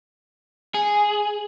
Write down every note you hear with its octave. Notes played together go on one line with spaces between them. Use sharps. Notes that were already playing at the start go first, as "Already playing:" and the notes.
G#4